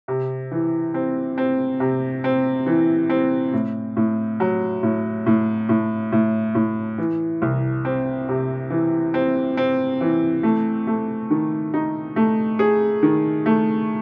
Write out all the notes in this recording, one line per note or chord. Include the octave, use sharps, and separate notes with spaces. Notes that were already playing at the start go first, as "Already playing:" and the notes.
C3
E3
C4
C4
C3
C4
E3
C4
A2
A2
F#3
A2
A2
A2
A2
A2
E3
C2
C4
C3
E3
C4
C4
E3
A3
A3
D#3
D#4
A3
G#4
D#3
A3